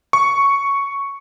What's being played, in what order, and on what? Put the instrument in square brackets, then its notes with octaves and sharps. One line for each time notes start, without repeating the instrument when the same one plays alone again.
[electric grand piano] C#6